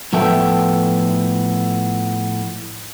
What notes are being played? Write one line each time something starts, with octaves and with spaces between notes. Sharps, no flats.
A2 F3 B3 A4 E5 G5